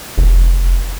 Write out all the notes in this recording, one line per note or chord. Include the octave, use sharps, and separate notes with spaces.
F1